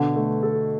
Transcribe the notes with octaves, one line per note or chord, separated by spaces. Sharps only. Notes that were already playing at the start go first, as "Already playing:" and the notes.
Already playing: B2 D3
A3
A4